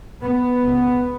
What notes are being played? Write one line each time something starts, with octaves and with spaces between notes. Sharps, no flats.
B3
C#2 C#3